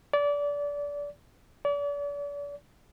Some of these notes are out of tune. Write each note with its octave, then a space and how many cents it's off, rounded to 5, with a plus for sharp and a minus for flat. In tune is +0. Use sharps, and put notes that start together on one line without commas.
D5 -25
D5 -40